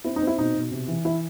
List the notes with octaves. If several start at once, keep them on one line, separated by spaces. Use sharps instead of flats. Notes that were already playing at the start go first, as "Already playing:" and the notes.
C4 E4
D#4
C4
E4
B2 D#4
B2
C3
E3
E3 E4